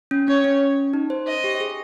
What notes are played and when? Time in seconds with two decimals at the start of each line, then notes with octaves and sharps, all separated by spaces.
0.11 C#4
0.27 C#4 C#5
0.44 C#4
0.94 D#4
1.10 C5
1.27 C5 D#5
1.44 G4
1.60 G#4